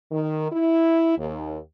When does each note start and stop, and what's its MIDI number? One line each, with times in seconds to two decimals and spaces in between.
0.12 0.46 51
0.51 1.15 64
1.17 1.58 39